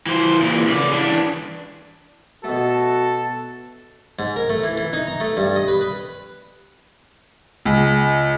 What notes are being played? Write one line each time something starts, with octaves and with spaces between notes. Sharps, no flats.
E3 C5
A#2 E3
C#3 D5
E3 D4
B2 A3 F#4 A4
G#2
A#4
A3
E3
E3
D#4
A#5
A3
G2
D#5
B4
B4
C#2